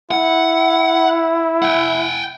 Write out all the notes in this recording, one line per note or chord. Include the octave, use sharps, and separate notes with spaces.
E4 F#5
F#5 G5